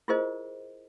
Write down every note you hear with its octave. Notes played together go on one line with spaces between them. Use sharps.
E4 F4 G#4 A#4 C5 D#5